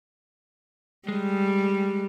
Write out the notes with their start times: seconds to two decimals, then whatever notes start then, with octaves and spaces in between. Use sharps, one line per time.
1.08 G3 G#3